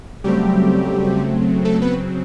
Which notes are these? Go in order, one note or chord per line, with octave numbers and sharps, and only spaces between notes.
C#3 F#3 G3 A3 C4 G4
A3 A4
B3 B4